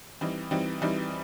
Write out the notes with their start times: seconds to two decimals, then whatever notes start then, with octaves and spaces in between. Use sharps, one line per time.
0.21 E3 G3 C4 D#4
0.51 E3 G3 C4 D#4
0.82 E3 G3 C4 D#4